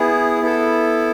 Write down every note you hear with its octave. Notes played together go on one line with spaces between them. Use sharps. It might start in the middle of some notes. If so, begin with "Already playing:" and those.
Already playing: B3 E4 G#4
B3 E4 A4